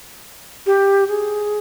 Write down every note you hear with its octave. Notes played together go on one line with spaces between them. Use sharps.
G4
G#4